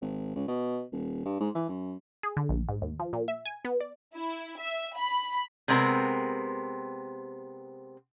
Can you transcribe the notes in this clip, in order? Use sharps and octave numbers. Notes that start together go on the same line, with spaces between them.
G#1
C#2
B2
D#1
G2
G#2
E3
F#2
G#4
D3
A#1
G#2
D#2
F3
A#2
E5
G#5
B3
D5
E4
E5
B5
C3 G#3 B3 C4 A#4